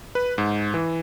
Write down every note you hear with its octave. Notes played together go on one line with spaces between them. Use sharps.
B4
G#2
E3